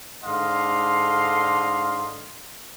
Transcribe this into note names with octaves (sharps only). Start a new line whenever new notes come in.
G#2 D3 D#5 F5 C6